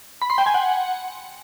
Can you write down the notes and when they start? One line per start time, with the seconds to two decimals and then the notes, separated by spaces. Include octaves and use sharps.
0.22 B5
0.30 C6
0.38 G5
0.46 G#5
0.54 F#5